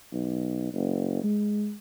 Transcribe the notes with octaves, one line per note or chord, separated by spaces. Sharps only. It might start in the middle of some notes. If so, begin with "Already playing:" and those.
B1
F#1
G#3